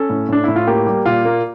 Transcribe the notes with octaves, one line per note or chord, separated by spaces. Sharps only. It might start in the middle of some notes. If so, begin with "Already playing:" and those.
Already playing: C#4 A4
A2
A2 D4
A2 E4
F4
A#3 G4
G3
A#2 F4
A#3